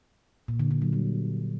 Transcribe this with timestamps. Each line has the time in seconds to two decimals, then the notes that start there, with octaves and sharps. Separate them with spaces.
0.48 A#2
0.59 D3
0.71 D3
0.82 F#3
0.93 G3